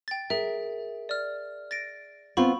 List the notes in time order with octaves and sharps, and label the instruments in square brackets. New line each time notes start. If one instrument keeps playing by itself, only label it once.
[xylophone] G5 A6
[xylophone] G#4 E5 [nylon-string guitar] A#4
[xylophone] D5 F6
A6 A#6 D7
[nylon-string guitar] B3 C4 F4 [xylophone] B5 C#6